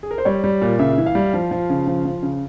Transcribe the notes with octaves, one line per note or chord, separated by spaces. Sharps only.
G#4
A#4
C5
G3 C#5
G3
A#2
C#3 E5
E3
F5
G3
F3
F3
C#3
F3
F3
C#3